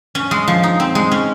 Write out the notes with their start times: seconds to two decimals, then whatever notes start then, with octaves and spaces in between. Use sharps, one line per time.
0.15 C#4
0.31 G#3
0.48 F3
0.63 D#4
0.80 C4
0.95 G#3
1.12 C#4